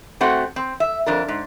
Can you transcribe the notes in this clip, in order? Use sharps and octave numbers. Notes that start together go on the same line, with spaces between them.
A3 C4 F#4 F#5
C4
E5
F2 D4 A#4
G#2